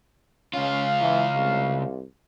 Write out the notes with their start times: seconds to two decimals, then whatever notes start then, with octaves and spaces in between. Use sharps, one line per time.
0.54 C#2 C#4 F4 F5
1.02 E3
1.36 C2